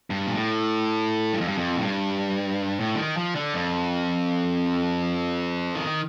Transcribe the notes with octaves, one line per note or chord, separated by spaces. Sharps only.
G2
A#2
A2
G2
F2
G2
F2
A2
G2
A2
D3
D#3
F3
D3
F2
D#3